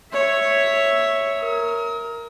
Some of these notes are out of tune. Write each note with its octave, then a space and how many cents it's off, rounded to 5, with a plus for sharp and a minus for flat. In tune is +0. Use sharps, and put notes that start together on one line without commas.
C#5 +0 E5 +0
A#4 +0 D#6 +40